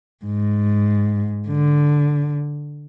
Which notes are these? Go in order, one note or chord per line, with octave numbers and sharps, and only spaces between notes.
G#2
D3